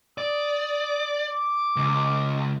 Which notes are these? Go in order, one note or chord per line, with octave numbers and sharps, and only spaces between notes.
D5 D#6
D6
C#2